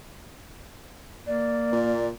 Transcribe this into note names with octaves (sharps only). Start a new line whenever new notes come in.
A#3 D5
A#2